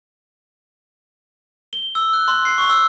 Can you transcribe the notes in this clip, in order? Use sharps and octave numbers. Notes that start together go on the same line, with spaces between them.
G7
E6
F#6
C6
C7
C#6
E6